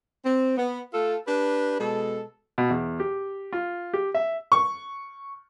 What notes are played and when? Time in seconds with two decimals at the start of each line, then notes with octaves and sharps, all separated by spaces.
0.25 C4
0.57 B3
0.94 A3 F4 A4
1.28 D4 G4 B4
1.80 B2 G#3 A4
2.58 B2
2.70 E2
3.00 G4
3.53 F4
3.94 G4
4.14 E5
4.52 C#6